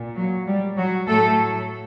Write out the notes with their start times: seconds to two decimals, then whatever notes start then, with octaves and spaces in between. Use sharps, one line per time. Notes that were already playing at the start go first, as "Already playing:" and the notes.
Already playing: A#2
0.16 F#3
0.47 G3
0.77 F#3 F#4
1.08 A2 F#3 A3 A4